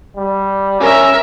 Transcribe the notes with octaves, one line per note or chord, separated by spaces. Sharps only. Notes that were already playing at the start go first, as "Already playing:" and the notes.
G3
C#4 A#4 E5